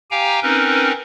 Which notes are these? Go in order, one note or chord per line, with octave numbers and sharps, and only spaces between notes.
G4 F5 G5 G#5 A#5
C4 C#4 D#4 A#4 B4